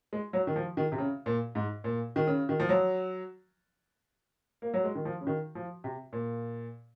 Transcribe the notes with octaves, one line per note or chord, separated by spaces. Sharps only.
G#3
F#3
D#3
F3
D#3
C3
C#3
A#2
G#2
A#2
D#3
C#3
D#3
F3
F#3
A#3
F#3
G#3
D#3
F3
C#3
D#3
F3
C3
A#2